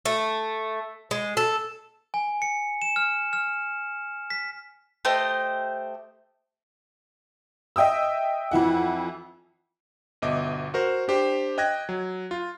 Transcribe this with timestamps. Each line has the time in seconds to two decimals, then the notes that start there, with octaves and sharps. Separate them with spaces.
0.05 A3
1.11 G#3
1.37 A4
2.14 G#5
2.42 C#7
2.82 E7
2.96 F6
3.33 F6
4.30 B6
5.05 A3 G4 C5 D#5
7.76 D#5 E5 G5 D#6 E6
8.51 F2 E3 E4 F#5
10.22 G1 B2 D#5 E5 D6
10.74 F#4 A#4 C5
11.08 D4 G4 C5
11.58 D#5 G5 F#6 G#6 A#6
11.89 F#3
12.31 F4